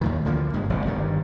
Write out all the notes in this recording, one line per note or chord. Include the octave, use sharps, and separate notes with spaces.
D#2 A2 D#3
D2 D3 F3 A#3
G1 G2 G#3
E1 A1 A2 C3
G1 G2 D#3